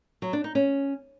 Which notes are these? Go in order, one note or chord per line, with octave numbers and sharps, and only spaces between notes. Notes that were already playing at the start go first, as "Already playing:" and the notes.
F#3
D4
D#4
C#4